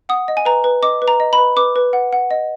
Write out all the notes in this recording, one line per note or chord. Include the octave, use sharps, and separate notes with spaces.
F#5 D#6
D#5
G#5
B4 A#5
B4
D#5 D6
B4
A#5
D#5
B5
B4
B4 D6
B4
F#5
F#5
D#5